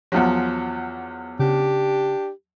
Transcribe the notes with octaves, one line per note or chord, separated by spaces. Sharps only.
E2 F3 F#3
C#3 D4 G4